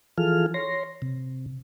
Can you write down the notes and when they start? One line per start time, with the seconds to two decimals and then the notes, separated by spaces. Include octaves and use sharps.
0.18 E3 F3 F4 G#4 A4 F6
0.54 C#5 C6 A#6
1.02 C3